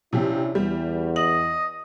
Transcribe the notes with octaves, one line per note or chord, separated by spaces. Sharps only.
C3 F3 C#4 D4 E4 G4
E2 G3
D#5 F#7